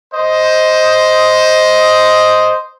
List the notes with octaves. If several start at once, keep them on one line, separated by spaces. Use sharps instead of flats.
C5 D#5